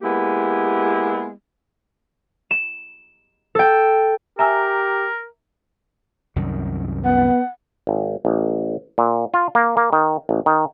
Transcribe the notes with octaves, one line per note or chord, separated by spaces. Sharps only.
G#3 A#3 B3 E4 G4
E7
A4 G5
G4 A#4 E5 G#5 A#5 E6
C2 F#2 D#3
B3 F#5
G#1
A1
A#2
F4
A#3
A#3
D#3
A1
D#3